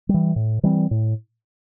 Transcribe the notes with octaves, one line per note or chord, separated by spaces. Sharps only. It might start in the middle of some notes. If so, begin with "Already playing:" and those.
G3
E3
A2
E3 G3 C4
A2